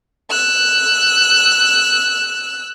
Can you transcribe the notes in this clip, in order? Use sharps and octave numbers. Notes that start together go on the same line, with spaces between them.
E6 F#6